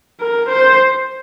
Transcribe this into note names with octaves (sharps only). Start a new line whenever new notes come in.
A#4
C5